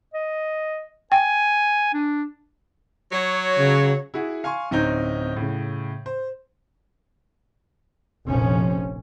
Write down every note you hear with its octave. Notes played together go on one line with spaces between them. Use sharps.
D#5
G5 G#5
D4
F#3 C#5
C#3
E4 F#4 G#4
F5 G#5 C6 C#6
D1 C4 C#4 D#4 G6
A2 C#3
C5
F1 A#1 F3 C#4